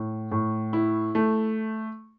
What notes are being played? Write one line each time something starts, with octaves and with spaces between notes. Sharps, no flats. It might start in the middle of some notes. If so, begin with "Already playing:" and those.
Already playing: A2
A2
E4
A3